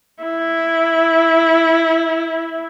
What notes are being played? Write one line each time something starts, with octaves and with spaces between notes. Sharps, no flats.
E4